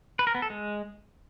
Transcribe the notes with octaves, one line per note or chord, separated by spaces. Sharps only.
B4
A#4
B3
A4
G#3